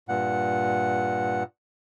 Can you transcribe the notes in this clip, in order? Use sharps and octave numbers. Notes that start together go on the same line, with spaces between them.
G2 A#2 F#5